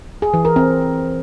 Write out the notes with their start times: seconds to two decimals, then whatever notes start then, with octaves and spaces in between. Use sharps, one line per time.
0.22 G#4
0.34 E3
0.45 A#4
0.56 C4